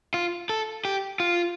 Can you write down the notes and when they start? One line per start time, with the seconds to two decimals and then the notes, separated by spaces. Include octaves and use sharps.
0.14 F4
0.49 A4
0.85 G4
1.20 F4